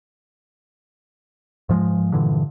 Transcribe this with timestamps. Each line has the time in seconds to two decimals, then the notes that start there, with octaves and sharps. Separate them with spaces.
1.69 G#2 F3 G3 G#3
2.12 G2 A#2 D3 E3